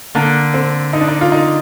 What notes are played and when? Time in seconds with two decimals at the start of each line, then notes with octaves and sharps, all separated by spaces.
0.15 D3 A#3
0.54 C4
0.93 D#4
1.01 D4
1.08 D#4
1.21 F4
1.32 D#4